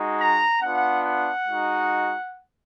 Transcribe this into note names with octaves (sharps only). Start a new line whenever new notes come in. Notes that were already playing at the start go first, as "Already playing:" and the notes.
Already playing: G#3 D#4 F#4
A#5
B3 D4 F4 F#5
F#5
G#3 D#4 F#4